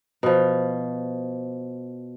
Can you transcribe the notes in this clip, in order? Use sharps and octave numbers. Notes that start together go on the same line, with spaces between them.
B2 F3